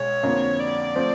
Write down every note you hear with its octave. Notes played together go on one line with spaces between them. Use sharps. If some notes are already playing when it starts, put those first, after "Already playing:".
Already playing: B1 G#3 C#5
F2 D3 F3 A#3
D5
F3 A3 C4